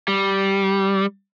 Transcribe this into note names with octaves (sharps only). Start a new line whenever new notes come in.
G3